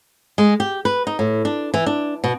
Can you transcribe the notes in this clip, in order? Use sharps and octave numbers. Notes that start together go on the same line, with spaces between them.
G#3
G4
B4
D#4
A2
D4
E3
D4
B2